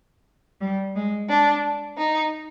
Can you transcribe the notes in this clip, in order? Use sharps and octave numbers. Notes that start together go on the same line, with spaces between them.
G3
G#3
D4
D#4